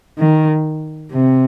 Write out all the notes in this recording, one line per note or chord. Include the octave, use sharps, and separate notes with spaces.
D#3
C3